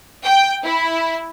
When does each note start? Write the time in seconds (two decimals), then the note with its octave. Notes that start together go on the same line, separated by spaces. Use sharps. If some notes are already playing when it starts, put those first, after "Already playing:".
0.23 G5
0.63 E4